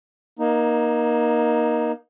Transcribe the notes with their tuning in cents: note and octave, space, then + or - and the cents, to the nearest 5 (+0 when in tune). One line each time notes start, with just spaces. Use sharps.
A#3 +25 D#4 +0